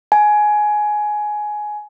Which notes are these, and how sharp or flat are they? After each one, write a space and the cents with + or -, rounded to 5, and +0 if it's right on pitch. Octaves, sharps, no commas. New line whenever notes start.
G#5 +15